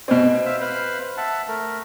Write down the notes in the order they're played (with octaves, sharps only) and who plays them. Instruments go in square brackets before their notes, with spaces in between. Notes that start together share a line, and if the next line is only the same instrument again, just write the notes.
[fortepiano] B2 C4 [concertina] G#5
[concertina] C5 E5 F5
B4 C5 F5
E5 F#5 A5
A3 A#4